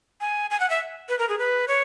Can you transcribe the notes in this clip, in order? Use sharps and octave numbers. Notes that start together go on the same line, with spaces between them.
G#5
G#5
F#5
E5
B4
A#4
G#4
B4
C#5